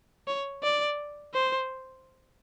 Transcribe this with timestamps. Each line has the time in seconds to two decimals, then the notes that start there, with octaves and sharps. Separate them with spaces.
0.27 C#5
0.63 D5
1.34 C5